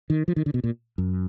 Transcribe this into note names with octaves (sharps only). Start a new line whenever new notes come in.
D#3
F3
D#3
D3
B2
A#2
F#2